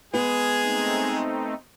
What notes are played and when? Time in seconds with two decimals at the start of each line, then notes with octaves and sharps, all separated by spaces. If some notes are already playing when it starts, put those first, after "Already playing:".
0.14 G#3 B3 G#4
0.62 A3 C4 D#4